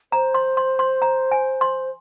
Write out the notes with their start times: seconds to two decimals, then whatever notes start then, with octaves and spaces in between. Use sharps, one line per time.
0.12 C5 A#5
0.34 C6
0.57 C6
0.79 C6
1.02 A#5
1.32 G#5
1.61 C6